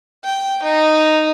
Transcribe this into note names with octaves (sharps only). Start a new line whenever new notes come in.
G5
D#4